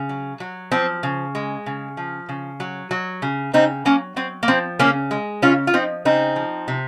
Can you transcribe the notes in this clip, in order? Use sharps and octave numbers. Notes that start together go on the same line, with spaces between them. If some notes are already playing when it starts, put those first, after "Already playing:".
Already playing: C#3
F#3
F#3
F3 C4
C#3
G#3
C#3
F3
C#3
F#3
F#3
C#3
C#3 C4 D#4
F#3 A#3 C#4
F#3 C4
A#3
F3 C4
C#3 A#3 C#4
G#3
C#3 C#4 F4
F4
F3 C4 D#4
C#3 C4 D#4
F3
C3